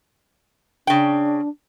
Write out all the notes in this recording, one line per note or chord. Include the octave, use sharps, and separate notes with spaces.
C#3 D4 G5